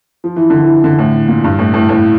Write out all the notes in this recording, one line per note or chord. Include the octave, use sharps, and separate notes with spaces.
F3
E3
D3
E3
D3
A2
A#2
G2
A2
A2
A2